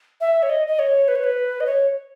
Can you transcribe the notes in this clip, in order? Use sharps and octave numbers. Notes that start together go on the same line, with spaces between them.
E5
C#5
D#5
D#5
C#5
B4
C#5
B4
D#5
C#5